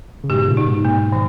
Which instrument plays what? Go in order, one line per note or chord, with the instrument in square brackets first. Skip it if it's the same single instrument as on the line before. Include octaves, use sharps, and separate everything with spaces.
[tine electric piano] C#3
[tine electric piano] G#2 B2 [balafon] G4
[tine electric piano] A#2 C#3
[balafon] D#4
[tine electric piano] G#2 B2
[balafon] A#3
D#3